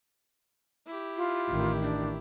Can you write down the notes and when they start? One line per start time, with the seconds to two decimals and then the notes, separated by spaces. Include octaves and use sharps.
0.87 E4 G4
1.17 F4
1.49 A1 D#3
1.81 D4